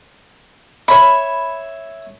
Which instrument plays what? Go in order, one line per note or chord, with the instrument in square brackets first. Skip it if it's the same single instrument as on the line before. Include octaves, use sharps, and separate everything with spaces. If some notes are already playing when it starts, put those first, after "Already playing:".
[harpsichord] C#5 E5 [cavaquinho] B5